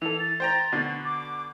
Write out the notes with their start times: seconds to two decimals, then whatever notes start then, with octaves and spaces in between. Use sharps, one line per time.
0.02 E3 A4 F7
0.19 A6
0.40 C5 G5 A#5
0.72 B2 D3
1.05 D6